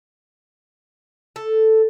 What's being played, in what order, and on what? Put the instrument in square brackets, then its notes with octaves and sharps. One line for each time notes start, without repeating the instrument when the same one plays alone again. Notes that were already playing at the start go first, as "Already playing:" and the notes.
[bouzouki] A4